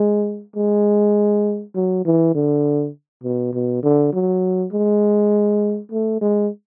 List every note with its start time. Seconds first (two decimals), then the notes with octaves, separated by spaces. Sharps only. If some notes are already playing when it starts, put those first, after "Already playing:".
Already playing: G#3
0.56 G#3
1.75 F#3
2.05 E3
2.35 D3
3.24 B2
3.53 B2
3.83 D3
4.13 F#3
4.73 G#3
5.92 A3
6.21 G#3